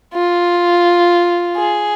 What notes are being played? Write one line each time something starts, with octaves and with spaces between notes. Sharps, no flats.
F4
G#4